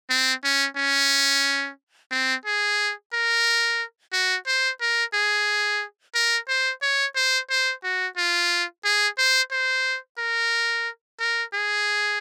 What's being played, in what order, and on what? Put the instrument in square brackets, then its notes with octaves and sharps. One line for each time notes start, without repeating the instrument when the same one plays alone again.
[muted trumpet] C4
C#4
C#4
C4
G#4
A#4
F#4
C5
A#4
G#4
A#4
C5
C#5
C5
C5
F#4
F4
G#4
C5
C5
A#4
A#4
G#4